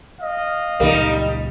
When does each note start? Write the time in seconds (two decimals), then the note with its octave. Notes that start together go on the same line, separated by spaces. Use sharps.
0.19 D#5 F5
0.80 C#2 A#2 G3 A#3 D#4